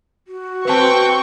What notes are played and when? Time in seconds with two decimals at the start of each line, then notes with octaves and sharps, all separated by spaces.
0.28 F#4
0.65 C4 B4 G5 A5 C#6